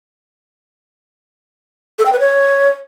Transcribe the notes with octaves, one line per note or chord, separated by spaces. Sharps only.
A4
G5
B4
C#5